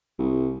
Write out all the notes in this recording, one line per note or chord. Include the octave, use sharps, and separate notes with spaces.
C2